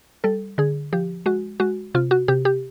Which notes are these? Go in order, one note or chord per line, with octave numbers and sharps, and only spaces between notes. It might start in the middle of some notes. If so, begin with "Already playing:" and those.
G3 A4
D3 G#4
F3 G4
G#3 F#4
G#3 F#4
C3 F4
F#4
C3 G4
G4